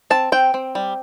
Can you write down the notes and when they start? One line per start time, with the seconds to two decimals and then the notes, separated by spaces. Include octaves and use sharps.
0.10 C4 A5
0.32 C4 G5
0.54 C4
0.75 G3